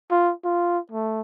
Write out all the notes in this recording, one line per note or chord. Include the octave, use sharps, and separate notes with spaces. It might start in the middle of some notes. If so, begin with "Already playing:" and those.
F4
F4
A3